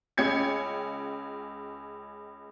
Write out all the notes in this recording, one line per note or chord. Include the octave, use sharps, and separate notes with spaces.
C#2 C#4 G5 G#6 C#7